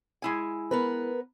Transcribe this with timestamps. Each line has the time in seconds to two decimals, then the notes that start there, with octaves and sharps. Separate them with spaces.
0.22 G#3 E4 G#5
0.71 B3 A#4 B4